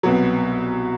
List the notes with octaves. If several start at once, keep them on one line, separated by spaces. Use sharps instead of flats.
C2 B2 F#3